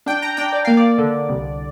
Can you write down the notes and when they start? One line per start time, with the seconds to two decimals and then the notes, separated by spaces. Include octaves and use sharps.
0.06 D4 G5
0.22 A#5
0.37 D4 G5
0.53 D5
0.65 A#3 F5
0.77 D5
0.98 D3
1.29 C2